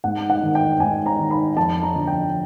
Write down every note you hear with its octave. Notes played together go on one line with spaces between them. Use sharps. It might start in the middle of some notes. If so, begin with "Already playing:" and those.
G#2 F#5
F#5
D#3
G5
G#2 G#5
A#5
D#3
B5
F2 A5
A#5
D3 F3
G5